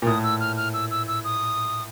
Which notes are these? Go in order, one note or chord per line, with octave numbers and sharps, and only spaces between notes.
A#2
A2 D#6
E6
F6
F6
E6
E6
E6
D#6